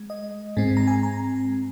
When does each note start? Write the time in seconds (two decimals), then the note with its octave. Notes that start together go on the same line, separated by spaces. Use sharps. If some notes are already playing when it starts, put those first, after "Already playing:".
Already playing: G#3
0.10 D#5
0.57 G#2 G#3 C4
0.77 A#5
0.87 G#5
1.03 A#5